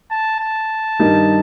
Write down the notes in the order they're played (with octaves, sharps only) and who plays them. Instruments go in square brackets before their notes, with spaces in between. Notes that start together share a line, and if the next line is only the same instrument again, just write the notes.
[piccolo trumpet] A5
A5
[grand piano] G2 D#3 G3 D#4